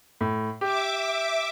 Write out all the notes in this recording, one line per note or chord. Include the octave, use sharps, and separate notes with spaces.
A2
G4 E5 D6